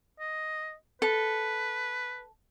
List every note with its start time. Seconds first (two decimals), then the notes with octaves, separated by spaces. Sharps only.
0.19 D#5
1.02 A4 B4